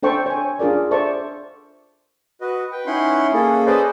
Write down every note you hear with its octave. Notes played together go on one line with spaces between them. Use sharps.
D4 A4 C5 G5 C#6
C#5 G#5
D4 F4 G#4 A#4 D5
A4 C5 D5 E5 A5 C#6
F#4 B4 D#5
B4 G5
C#4 D#4 E4 F#5 B5 C6
A#3 C#4 G#4 A4
G#4 A4 B4 C5 D5 D#5